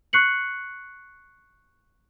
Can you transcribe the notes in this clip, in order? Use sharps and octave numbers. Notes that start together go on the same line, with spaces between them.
C#6 F#6 C7 C#7 F#7